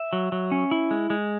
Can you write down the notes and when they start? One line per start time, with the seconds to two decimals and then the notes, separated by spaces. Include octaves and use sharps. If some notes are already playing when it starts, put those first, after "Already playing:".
Already playing: E5
0.13 F#3
0.32 F#3
0.52 C#4
0.71 E4
0.91 G#3
1.10 G#3